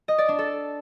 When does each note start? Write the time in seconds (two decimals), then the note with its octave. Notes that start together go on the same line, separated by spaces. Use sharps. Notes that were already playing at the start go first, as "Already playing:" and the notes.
0.08 D#5
0.18 D5
0.28 D4
0.39 A4